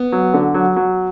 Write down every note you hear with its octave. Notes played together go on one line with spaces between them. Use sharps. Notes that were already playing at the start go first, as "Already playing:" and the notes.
Already playing: B3
F#3
D3
F#3
F#3